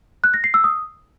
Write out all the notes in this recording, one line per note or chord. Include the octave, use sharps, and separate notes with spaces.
F#6
A#6
C7
E6
D#6